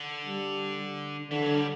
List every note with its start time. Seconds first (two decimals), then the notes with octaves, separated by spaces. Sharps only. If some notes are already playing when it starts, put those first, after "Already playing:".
Already playing: D3
0.26 G3
1.31 D3 E3
1.42 F#3
1.54 G3